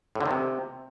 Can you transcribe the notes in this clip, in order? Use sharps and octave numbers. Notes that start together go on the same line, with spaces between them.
A2
D3
D#3
C3